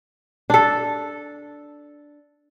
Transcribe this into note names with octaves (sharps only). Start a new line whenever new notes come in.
D4 A4